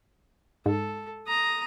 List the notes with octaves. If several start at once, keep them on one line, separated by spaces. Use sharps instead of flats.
G#2 A4
A#5 D#6